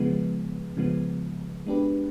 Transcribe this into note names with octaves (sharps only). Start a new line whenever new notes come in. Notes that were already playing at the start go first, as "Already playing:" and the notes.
Already playing: C#3 F3 G#3 B3
C#3 F3 G#3 B3
G#3 B3 D4 G4 B4